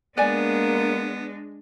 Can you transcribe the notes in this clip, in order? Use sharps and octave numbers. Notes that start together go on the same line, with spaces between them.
G#3 A#3 B3 D4 D5 G#5